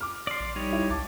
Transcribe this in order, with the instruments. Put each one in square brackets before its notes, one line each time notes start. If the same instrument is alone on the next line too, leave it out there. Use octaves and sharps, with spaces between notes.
[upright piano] D6 F6
[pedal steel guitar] D5 C6
[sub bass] A#1
[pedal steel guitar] G3 D#4 C#5
[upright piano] E4
[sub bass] C#2 [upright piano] A5 D6 A6